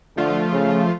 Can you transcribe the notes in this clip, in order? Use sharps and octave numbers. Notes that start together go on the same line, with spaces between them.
D3 F3 A3 F4
C#3